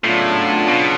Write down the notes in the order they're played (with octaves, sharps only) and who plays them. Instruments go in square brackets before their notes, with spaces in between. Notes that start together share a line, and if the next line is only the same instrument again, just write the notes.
[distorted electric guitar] A2 [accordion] C#3 F#3 B3 D4 F4
[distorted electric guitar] B2